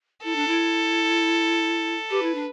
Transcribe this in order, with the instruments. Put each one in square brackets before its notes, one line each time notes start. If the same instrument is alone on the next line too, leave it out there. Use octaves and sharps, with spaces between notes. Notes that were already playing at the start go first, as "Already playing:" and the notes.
[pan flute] E4 [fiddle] A4
[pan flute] D4
E4
[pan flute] G4 [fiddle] B4
[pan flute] E4
D4